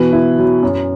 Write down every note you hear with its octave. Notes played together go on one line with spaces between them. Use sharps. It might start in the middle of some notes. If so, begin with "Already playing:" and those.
Already playing: B2 E3 B4
E4
F#3
F#2